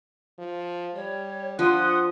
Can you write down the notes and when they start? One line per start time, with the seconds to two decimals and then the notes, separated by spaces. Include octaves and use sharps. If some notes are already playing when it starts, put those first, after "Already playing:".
0.39 F3
0.95 G3 C#5
1.59 F3 D4 F#5 C6 D#6